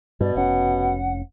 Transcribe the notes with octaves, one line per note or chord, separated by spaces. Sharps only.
G2 B2 D5
F1 C#4 F#5